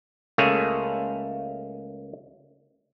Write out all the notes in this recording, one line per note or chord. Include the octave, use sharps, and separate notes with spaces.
C#2 A3 A#3 G#4 C#5